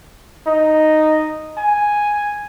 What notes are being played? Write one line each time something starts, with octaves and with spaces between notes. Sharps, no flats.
D#4
G#5